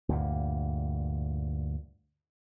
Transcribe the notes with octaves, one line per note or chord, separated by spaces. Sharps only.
D2 G2 A#2